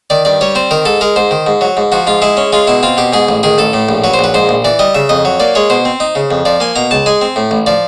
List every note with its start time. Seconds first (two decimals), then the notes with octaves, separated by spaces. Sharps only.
0.10 D#3 D5
0.25 G2 D5
0.41 G3 C#5
0.55 C4 C5
0.71 D#3 A#4
0.85 G#2 A4
1.01 G#3 A#4
1.16 G#2 C5
1.31 D#3
1.47 G#2
1.61 F#3
1.77 G#2
1.92 F3 F#4
2.07 G#2 F4
2.22 G#3 E4
2.37 C#4
2.53 G#3 F4
2.67 B2 E4
2.83 C4 F4
2.97 B2 G4
3.13 G#2 G#4
3.29 A1
3.43 D#3 G#4
3.58 A1 A4
3.73 A2
3.89 A#1
4.04 F#3 B4
4.14 C5
4.19 A#1 B4
4.34 G#2 C5
4.49 A#1
4.65 E3 D5
4.79 G3 D#5
4.95 C#3 E5
5.09 F2 D#5
5.25 F#3
5.40 A#3 D5
5.55 G#3 C#5
5.70 B2 C5
5.85 C4
6.00 D#4
6.15 C#3
6.31 F2
6.45 F3 D5
6.60 A#3 G#5
6.76 B2 A#5
6.91 C#2 A5
7.06 G#3 G#5
7.21 C4
7.36 A2
7.51 A1
7.66 F3 D5